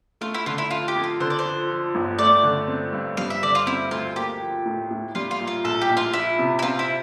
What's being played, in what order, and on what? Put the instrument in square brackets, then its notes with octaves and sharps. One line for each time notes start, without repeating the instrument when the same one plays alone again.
[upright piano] A3 [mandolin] F4
[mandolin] E4
[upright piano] D3 [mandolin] F4
[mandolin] E4
[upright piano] F2 [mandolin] F4
[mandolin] G4
[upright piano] F2
[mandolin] F4
[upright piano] D3 [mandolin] C5
[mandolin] D5
C5
[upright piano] F2
F3
G1
[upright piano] A3 [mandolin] D5
[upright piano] D3
C4
G2
[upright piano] G3 [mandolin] F5
[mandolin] E5
[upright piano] D3 [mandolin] D5
[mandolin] F4
[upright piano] C4 [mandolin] E4
[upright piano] D2 [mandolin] F4
[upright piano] A#3 [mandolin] G4
[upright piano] F3
A2
A2
[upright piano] G3 [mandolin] F4
[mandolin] F4
[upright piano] A#2
[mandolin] F4
[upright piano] A#1 [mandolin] A4
[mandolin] G4
[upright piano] A#1
[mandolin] F4
[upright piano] F3 [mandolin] E4
[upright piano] C3
[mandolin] E4
[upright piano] C4 [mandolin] F4
[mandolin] E4